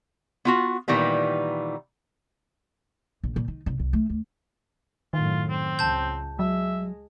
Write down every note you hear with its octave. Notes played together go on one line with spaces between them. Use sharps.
B3 F4 F#4
A#2 D#3 E3 G3 B3
A#1
A#2
D#3
C2
C2
A3
D2
F#2 A2 D#3 F4
C4
C#2 A5 G6
F#3 G#3 E5